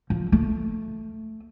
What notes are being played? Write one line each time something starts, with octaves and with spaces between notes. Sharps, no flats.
F3
A3